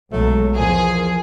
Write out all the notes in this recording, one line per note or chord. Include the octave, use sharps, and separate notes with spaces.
B1 F#3 G#3 A3
E2 F3 G#4 A#4